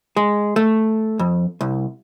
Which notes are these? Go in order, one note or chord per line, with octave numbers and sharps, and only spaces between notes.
G#3
A3
F2
C2